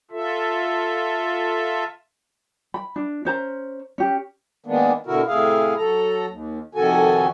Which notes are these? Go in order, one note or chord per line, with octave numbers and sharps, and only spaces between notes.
F4 A4 E5
B5
D4
C#4 C5 A#5
C#4 G4
D#3 G#3 A#3 B3 D4
B2 D3 E4 F#4 A#4
A2 C3 E4 G#4 F5
F#3 A4 A#5
D#2
F2 C3 D#3 F#4 A4 G#5